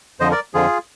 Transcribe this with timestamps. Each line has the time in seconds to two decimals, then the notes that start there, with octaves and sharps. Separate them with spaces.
0.20 F2 D3 F3 C5 D#5
0.31 A#4 D5
0.54 F2 D3 F3 F4 G#4